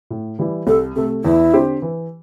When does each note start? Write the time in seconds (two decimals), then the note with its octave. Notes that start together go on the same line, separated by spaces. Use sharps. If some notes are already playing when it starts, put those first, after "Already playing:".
0.10 A2
0.39 E3 G3 E4
0.67 C2 A4
0.96 C3 A3 A4
1.24 E2 E4
1.53 D3 C4 G4 C5
1.82 E3